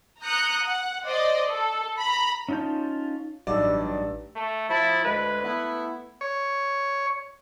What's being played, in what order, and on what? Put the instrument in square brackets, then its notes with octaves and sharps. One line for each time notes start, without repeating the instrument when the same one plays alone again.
[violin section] A#5 D#6 F#6 G6 C#7
F#5
C5 D5 D#5
A4
A#5 B5
[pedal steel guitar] C#4 D#4 F4 A5 G6
[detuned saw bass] A1 [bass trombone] G2 [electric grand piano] F#3 D#4 E6 [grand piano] D5
[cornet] A3
[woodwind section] F3 A5 [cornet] E4
[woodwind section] D2 G#3 [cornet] B4
[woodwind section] A3 B3 E4
[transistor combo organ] C#5